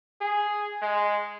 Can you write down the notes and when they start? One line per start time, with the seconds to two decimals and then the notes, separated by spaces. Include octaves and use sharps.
0.21 G#4
0.82 G#3